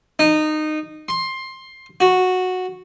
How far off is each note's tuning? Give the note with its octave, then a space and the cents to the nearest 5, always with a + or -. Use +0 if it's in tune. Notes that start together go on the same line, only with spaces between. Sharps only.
D#4 -20
C6 +15
F#4 -10